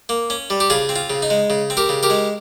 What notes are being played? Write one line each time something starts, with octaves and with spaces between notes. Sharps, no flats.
A#3
C#4
G3
G4
C#3 F4 G#4
C4
F4
C#3
D#4
G#3
C#3
C4
G4 A#4
C#3
G4 A#4
G#3